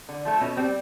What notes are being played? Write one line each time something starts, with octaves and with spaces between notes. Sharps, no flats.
D3
F3 A3
B2 C#4
G3 C4